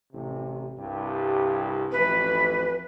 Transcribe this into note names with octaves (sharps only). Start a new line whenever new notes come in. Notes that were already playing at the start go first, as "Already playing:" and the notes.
A1 C3
C2 G2 G4
A1 F2 E3 B4